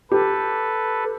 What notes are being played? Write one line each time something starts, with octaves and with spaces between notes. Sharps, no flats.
G4 A4 B4